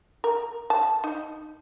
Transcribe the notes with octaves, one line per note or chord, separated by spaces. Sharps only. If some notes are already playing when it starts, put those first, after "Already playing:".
A#4
A5
D#4